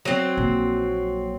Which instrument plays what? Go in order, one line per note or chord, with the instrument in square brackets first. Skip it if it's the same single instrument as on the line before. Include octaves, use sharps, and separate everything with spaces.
[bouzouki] F#3 C4
[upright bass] A#1 A#2